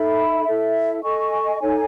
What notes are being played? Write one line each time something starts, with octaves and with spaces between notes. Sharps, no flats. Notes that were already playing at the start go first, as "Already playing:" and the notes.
Already playing: D#4 A4 E5 B5
E4 A4 E5
A4 D#5 G#5 C#6
D#4 A4 C#5 G#5